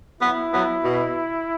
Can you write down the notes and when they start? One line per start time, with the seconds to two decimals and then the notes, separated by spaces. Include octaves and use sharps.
0.20 F#3 B3 E4
0.52 F#3 B3
0.84 B2